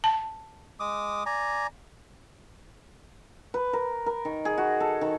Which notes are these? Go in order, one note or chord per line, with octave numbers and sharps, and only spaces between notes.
A5
G#3 D6 D#6
D5 G#5 A#5
B4
A#4
A#4
D#3
G#4
F#4
A4
D#3